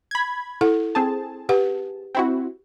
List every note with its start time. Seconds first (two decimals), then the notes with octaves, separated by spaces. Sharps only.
0.11 B5 G#6
0.61 E4 A4 F#5
0.95 C4 G#4 A5
1.49 G4 B4 F#5
2.15 C4 E4 F#4